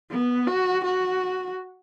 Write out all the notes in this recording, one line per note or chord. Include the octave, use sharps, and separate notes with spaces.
B3
F#4
F#4